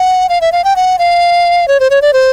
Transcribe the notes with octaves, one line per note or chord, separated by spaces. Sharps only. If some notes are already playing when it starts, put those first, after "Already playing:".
Already playing: F#5
F5
E5
F5
G5
F#5
F5
C#5
C5
C#5
D5
C5